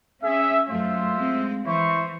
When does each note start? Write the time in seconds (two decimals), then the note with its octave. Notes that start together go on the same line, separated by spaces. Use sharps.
0.23 C#4 G#4 E5
0.69 F#2 F#3 A3 F4 C5 E5
1.15 G#3 C4
1.66 E3 E4 C5 C#6